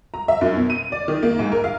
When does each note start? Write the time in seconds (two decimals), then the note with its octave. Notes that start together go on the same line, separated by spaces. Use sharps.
0.14 A#5
0.28 E5
0.41 F#2
0.56 B2
0.70 D#7
0.92 D5
1.08 D#3
1.23 A#3
1.39 G#2
1.52 A#4
1.64 F5